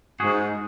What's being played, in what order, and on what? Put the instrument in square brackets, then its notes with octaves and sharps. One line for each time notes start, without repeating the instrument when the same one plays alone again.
[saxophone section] G#2 [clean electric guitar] F#4 G#4